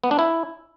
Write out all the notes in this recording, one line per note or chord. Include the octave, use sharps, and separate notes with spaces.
B3
D4
E4